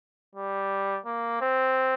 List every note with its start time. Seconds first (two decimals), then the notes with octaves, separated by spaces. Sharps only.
0.35 G3
1.06 A#3
1.42 C4